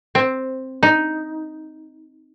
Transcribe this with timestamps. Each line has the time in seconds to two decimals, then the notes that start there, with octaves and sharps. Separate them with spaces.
0.15 C4
0.83 D#4